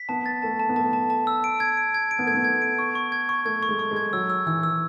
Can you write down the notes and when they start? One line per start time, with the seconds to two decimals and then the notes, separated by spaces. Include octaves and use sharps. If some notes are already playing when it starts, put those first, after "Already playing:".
Already playing: B6
0.09 B3 A5
0.26 A6
0.42 A3 A5
0.60 A5
0.69 B3
0.76 A3 A5
0.93 A5
1.10 A5
1.27 E6
1.44 D7
1.60 G#6
1.77 D7
1.94 G#6
2.11 D7
2.19 B3
2.26 A3 G#6
2.35 B3
2.44 G#6
2.62 D7
2.79 C#6
2.95 C#6
3.12 G#6
3.29 C#6
3.45 A3 G#6
3.63 C#6
3.69 G#3
3.79 C#6
3.91 G#3
3.96 G#6
4.13 F#3 E6
4.30 E6
4.46 E3 E6
4.63 E6